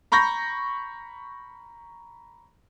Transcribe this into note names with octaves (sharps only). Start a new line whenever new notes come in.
A#5 B5 C#6 G6 A#6